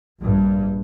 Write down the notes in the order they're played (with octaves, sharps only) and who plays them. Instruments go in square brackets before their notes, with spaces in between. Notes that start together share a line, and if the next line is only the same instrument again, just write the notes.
[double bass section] A#1 G2